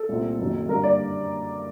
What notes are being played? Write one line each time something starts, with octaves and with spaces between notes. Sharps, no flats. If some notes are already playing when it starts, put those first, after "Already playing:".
Already playing: A4
C2 A#2 A3 C4
F#1 F#2 D#3
G2 D3 G3 A#3 A#4
D5